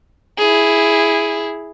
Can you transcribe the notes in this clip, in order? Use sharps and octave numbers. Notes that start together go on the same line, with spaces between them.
E4 G#4